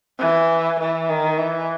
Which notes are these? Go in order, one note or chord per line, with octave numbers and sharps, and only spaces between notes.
E3
E3
D#3
E3